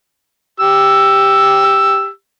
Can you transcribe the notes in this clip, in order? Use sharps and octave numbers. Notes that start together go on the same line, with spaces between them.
G4 E6